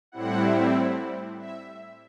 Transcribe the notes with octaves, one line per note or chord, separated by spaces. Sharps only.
A2 G3 C4 E4 F#5
E5